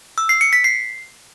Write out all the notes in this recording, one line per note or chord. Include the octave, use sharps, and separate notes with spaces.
E6
C7
C#7
B6
C7